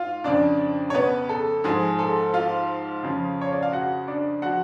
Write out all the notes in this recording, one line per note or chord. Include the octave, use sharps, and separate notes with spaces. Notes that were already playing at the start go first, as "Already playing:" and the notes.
Already playing: G#2 F4 F5
F2 C#3 F3 D4 D5
C#5
B3 B4
A4
G#2 F3 G#4
A4
F4 F5
F2 C#3 F3
C#5
D5
F5
F#4 F#5
D4 D5
F3 F#4 F#5